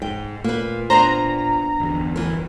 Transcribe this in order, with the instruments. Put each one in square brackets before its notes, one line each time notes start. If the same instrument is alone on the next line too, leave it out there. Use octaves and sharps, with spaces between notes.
[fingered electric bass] G#2 [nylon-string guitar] G5
[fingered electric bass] A#2 [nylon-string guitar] A#3 B4
[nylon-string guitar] B3 D4 C5 [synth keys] A#5
[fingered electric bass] G1 E2
[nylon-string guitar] E3 A#4